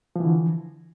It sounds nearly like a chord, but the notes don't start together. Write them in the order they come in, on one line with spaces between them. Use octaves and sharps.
F3 E3 D3